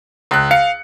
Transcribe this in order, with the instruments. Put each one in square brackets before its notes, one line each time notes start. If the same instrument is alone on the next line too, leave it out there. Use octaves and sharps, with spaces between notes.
[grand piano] C#2 F#6
[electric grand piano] F5 [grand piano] C#7